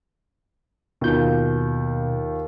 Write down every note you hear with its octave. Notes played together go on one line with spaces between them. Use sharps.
D#2 B2 F4 G6